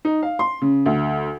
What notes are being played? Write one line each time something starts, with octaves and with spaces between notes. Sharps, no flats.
D#4
F5
C6
C#3
D2